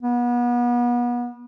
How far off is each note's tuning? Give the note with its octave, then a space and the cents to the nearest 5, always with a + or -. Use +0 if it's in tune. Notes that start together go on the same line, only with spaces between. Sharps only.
B3 -30